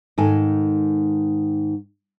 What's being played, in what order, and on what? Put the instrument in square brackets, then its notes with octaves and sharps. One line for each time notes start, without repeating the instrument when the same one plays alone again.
[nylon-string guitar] G#2 D#3 A4 G#5